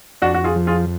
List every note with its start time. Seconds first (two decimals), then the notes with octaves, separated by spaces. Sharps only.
0.22 F2 D4 F#4
0.34 F#4
0.44 F4 G#4
0.56 F3
0.67 F4 G#4